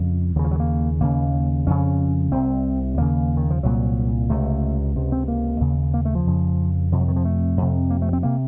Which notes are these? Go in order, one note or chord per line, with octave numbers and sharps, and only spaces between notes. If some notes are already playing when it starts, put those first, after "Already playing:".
Already playing: F2 C#3
D#2 C#3 D#3
F3
F#3
A#3
D#2 C#3 A#3
F2 C#3 C#4
C2 C3 C4
D#2 C#3 A#3
D#3
F3
C2 A#2 F#3
C#2 C3 A3
C#2 C3
C4
A#3
D#2 C#3
A#3
A3
F3
F2 C#3
F2 C3 F3
F#3
D#3
F3
A3
F2 C3
A#3
A3
C4
C3 A#3